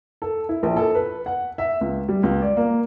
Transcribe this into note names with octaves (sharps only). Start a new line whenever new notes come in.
A4
E4
A#1
A4
B4
F#5
E5
C#2
G3
C#2
D5
A#3